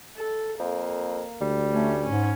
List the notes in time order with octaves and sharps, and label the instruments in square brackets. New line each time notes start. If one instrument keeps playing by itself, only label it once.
[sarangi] A4
[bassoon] F2 [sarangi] A#3
[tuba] D2 [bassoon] G3
[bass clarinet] A3 [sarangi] C#4
[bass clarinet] G#2 [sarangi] C#4